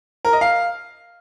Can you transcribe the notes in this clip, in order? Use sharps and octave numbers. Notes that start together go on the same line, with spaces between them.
A#4
D#5
F5